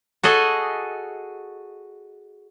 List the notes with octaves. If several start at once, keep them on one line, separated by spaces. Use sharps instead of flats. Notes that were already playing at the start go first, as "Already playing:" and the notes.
F#4 G#4 A4 D#5